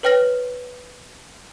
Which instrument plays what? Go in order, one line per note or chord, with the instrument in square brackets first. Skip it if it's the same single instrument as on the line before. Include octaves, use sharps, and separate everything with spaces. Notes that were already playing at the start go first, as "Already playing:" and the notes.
[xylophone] B4 C#5 G5 F6 A#6 F#7